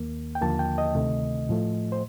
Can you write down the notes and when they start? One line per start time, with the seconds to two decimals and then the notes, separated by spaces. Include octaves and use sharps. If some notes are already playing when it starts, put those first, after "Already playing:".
Already playing: D#2 D#3 A#3
0.35 G5
0.41 D#2 D3 F3 A#3 A5
0.59 G5
0.78 D#5
0.95 D2 C3 D#3 A3
1.49 A2 F3 A3
1.92 C5